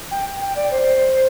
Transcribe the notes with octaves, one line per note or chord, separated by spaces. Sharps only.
G5
G5
D5
C5